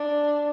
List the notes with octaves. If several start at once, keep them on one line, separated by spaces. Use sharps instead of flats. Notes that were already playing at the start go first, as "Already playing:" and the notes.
Already playing: D4